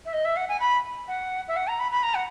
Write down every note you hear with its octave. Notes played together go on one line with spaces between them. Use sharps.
E5
D#5
E5
F#5
G#5
B5
F#5
E5
F#5
A#5
B5
B5
A#5
F#5